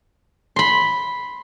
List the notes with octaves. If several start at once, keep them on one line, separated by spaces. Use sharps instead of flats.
B5 C6